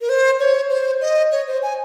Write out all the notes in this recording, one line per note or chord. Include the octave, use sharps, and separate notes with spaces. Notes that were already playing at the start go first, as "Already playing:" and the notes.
A#4
C5
C#5
C5
D#5
C#5
C5
G#5